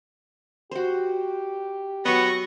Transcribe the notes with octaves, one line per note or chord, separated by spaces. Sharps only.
F#4 G4 C5
F#3 B3 D#5 C#6 A#6